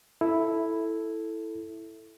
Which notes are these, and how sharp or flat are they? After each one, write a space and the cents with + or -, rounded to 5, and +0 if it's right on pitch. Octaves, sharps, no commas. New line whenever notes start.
E4 +0 A4 +0